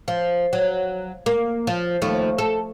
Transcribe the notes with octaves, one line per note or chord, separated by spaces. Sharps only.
F3
F#3
A#3
F3
D#2 F3 A3
A4